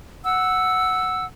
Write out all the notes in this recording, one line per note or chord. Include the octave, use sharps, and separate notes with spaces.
F#5 E6